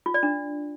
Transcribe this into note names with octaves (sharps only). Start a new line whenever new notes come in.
F4
D5
D4